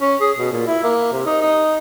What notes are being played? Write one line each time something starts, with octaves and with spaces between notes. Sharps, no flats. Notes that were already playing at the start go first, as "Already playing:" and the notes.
C#4
G#4
B2
A#2
E4
A#3
C3
D#4
D#4